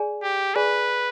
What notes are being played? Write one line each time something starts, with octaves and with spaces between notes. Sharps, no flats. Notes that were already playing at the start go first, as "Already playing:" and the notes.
Already playing: G#4 D5 G#5
G4
G#4 B4 D5 G#5